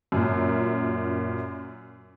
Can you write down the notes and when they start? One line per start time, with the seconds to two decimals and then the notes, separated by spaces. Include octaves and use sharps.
0.12 F#2 A#2